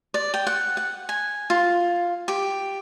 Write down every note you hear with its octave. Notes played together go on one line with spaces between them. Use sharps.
D5
G5
F#5
F#5
G#5
F4
G4